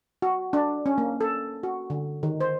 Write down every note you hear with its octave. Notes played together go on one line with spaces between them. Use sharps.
F#4
D4
C#4
A#3
A4
F#4
D3
D#3
C5